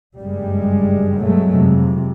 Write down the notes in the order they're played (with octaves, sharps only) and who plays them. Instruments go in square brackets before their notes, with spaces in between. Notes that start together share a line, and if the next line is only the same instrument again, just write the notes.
[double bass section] F#1 G2 G3 G#3
G2 B2 F#3 G#3 A3
F2 C3